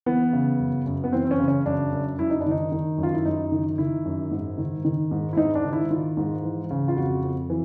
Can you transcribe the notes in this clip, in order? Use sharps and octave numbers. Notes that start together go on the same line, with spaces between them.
E3 B3
C#3
F#2
F#2
B3
E3 C4
C4
C#4
C#3
C#4
F#2 D4
F#2
F#2 E4
D#4
D4
D#3 D#4
D#3
F#2
F4
E4
F#2 D#4
D#3
D#3 E4
F#2
G#2
D#3
D#3
G#2
E4
G#2 D#4
D4
D#3
E4
D#3 F4
G#2
E3
C#3
F4
F2 F#4
F2
E3